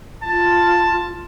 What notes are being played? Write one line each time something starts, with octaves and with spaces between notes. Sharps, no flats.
F4 A5